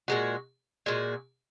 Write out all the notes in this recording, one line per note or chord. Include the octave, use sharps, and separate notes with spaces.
A#2 G#3 F#4
A#2 G#3 F#4